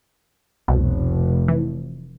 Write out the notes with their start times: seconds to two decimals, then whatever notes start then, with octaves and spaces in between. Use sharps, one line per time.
0.68 F1 C2 B2
1.48 E3